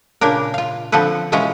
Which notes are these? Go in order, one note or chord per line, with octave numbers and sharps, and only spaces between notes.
A#2 C#3 A#3 D4 A#4
F4 F5
D3 F3 C4 A4 B4
B2 E3 G#3 C#4 F4 A#5